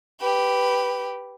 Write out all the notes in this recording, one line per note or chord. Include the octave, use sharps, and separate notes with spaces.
G4 B4